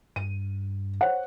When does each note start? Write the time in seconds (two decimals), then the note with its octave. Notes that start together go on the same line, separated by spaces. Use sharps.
0.16 G2 D#7
1.01 C5 C#5 F#5